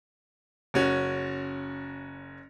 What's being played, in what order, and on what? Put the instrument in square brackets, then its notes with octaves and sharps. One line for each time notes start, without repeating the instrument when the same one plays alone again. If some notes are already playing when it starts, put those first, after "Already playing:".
[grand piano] F#1 C#4 F#4